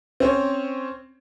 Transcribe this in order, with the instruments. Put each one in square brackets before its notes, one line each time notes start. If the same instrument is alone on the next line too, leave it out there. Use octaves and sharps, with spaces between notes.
[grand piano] C4 C#4 C5 C#5